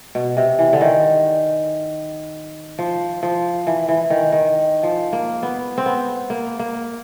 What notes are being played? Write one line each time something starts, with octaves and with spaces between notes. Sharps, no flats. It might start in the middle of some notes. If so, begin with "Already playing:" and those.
B2
C3
E3
D3
D#3
F3
F3
E3
E3
D#3
D#3
F3
A#3
B3
C4
B3
A#3
A#3